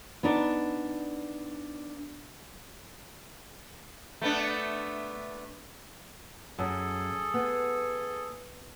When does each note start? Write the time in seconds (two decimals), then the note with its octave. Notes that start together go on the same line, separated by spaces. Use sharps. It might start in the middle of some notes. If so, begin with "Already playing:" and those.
0.23 B3 D4 D#4 D5
4.21 A3 B3 D4
6.59 F#2 G#4 A4
7.34 B3